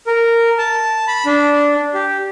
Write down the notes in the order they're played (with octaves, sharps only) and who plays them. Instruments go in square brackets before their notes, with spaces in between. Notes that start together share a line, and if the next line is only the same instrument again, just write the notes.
[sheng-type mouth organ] A#4
A5
B5
D4
G4